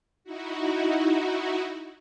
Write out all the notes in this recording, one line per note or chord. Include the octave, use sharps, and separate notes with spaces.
D#4 E4 F#4